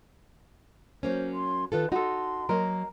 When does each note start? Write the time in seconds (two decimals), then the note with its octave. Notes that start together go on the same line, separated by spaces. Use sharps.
1.03 F#3 A#3 C#4 C5
1.33 C6
1.72 D#3 F4 A4 B4
1.92 D#4 F#4 A4 C6
2.49 F#3 A#3 A#4 D#5